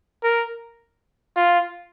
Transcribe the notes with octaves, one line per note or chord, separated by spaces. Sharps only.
A#4
F4